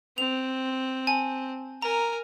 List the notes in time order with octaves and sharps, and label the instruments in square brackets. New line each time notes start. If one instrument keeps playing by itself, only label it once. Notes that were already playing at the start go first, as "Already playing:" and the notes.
[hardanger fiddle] C4 [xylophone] F7
[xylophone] G#5 A5
[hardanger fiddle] A#4 G#5 [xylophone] A#5